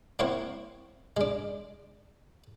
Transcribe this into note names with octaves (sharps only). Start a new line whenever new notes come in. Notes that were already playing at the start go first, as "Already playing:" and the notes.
A#3 C4 E4 C#5 F#5
G#3 D4